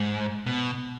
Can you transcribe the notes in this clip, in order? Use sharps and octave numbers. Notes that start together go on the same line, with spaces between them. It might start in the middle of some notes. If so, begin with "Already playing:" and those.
Already playing: G#2
B2